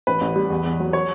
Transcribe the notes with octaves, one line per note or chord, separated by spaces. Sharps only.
A1 B4
A1
G3
E2
E2
F#3
C#5